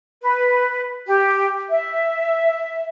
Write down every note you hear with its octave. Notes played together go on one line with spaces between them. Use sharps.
B4
G4
E5